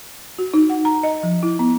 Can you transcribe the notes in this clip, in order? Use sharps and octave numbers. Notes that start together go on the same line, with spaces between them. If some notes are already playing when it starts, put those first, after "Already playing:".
F#4
D#4
F#5
A#5
D#5
F3
E4
B3